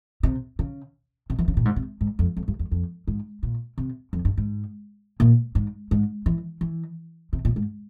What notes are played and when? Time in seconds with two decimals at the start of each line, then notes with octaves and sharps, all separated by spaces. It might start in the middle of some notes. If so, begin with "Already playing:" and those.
0.23 C3
0.59 C#3
1.30 C3
1.39 E3
1.48 C#3
1.57 A#2
1.65 G#2
1.76 C3
2.01 G#2
2.19 F2
2.37 F2
2.48 G2
2.59 E2
2.71 F2
3.08 G#2
3.43 A#2
3.78 C3
4.13 F2
4.25 G2
4.38 G#2
5.20 A#2
5.55 G#2
5.91 G#2
6.26 E3
6.61 E3
7.33 C3
7.45 A#2
7.56 G#2